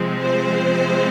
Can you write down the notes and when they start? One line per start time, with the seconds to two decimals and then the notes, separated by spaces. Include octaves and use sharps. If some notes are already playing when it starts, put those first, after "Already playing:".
Already playing: C3 F3 G#3 C4
0.21 C5